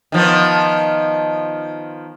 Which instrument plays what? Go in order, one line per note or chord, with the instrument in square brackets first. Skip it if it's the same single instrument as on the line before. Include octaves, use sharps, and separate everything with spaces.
[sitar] D#3 F3 B3